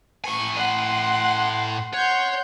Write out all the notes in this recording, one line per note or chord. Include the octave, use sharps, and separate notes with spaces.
A2 G#5 C#6
F#5 C6
C#5 F#5 C6 G6